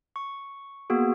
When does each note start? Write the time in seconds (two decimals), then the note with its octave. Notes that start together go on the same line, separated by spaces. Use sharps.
0.16 C#6
0.90 A#3 B3 F#4 G#4